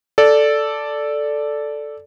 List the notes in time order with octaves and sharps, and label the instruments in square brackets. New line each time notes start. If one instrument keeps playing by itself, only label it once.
[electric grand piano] A4 D5